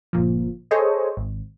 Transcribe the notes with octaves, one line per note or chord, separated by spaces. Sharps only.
G1 A#2 F3
G#4 A4 C5 C#5 D#5
G#1